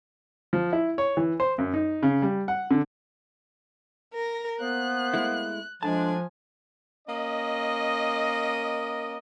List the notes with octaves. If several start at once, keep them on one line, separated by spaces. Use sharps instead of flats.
F3
E4
C#5
E3
C5
F#2
D#4
C#3
G3
F#5
D3
A#4 A#6
A#3 B3 C5 F#6
G#3 A3 E4
A2 F3 G#3 D4 G#5 A5
A#3 C#4 D#5